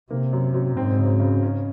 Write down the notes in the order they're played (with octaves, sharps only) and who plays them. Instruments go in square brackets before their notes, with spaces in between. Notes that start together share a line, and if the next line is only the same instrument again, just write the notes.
[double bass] C3 [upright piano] A#3
[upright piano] F#2
F#2
[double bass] G#2 [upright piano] C4
[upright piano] C#3
C#3
C#4